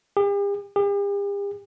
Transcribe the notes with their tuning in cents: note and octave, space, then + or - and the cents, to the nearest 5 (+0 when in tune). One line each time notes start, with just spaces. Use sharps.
G4 +45
G4 +45